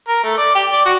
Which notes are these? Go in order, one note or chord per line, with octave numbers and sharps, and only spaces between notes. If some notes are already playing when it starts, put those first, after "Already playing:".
A#4
A3
D5
G4
D5
F#4